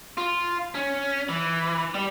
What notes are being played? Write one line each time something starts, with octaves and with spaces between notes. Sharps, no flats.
F4
C#4
E3
G3